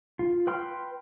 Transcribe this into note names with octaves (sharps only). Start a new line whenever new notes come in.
F4
B4 G5 C6 F6